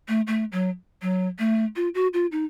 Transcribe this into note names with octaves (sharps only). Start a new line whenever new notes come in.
A3
A3
F#3
F#3
A3
F4
F#4
F4
D#4